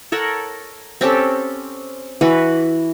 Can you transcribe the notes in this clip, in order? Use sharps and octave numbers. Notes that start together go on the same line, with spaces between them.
A4 A#4 C#5 F#5
C4 C#4 G4 A4
E3 F#4 B4